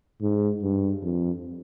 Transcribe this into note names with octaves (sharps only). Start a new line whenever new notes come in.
G#2
G2
F2